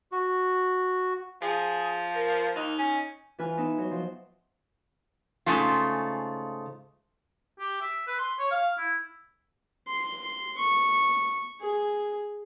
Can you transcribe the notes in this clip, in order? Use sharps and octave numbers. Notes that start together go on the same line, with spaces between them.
F#4
F3 G#4
A#4
D#2 D#4
C#4
E3 F4 B4 G#5 F6
B3 D#4 E5
F#3
F3 C6
G#2 C#3 A3 F4
G4
E5
B4
C6
C#5
F5
E4
C6
C#6
G#4